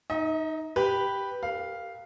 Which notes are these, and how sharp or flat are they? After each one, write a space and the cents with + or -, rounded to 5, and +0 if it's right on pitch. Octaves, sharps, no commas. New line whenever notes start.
D#4 +0 D#5 +45
G4 +0 B4 +0 G5 +0
G4 +0 A#4 -30 F5 +0